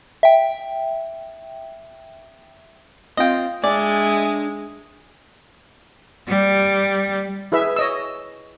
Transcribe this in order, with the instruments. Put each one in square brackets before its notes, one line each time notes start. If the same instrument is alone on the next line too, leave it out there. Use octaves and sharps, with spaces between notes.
[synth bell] E5 G5
[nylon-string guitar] C4 F4 F5 [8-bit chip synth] D#5 G5
[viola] G#3 [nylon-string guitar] D4 [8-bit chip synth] D5 [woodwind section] E5 G#5
[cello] G3
[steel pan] E4 G#4 B4 E5
C#5 D#5 E6